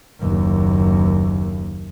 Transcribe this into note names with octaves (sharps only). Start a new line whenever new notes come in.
F#1 D#2